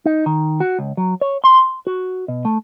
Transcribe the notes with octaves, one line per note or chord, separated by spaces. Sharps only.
D#4
D#3
F#4
C#2
F#3
C#5
C6
F#4
B2
A3